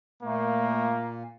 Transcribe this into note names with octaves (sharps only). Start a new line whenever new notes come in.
A#2 A3 A#3